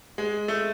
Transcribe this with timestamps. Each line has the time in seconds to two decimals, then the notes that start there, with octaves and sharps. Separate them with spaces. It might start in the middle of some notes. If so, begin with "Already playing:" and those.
0.18 G#3
0.48 A3